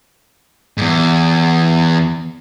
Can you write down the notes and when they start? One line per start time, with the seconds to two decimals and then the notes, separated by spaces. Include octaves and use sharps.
0.77 E2 G#2